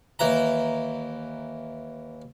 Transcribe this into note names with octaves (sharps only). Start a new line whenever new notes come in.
D#2 E3 A#5